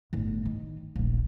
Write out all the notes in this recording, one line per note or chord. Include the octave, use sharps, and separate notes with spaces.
G1 A2
D#3
D#1 A#1